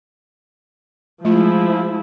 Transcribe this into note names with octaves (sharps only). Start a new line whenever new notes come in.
F3 G#3 A3 E4 F4